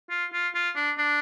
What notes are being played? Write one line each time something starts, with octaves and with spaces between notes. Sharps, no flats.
F4
F4
F4
D4
D4